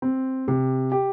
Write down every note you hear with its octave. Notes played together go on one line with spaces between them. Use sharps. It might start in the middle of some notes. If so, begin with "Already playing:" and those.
C4
C3
G4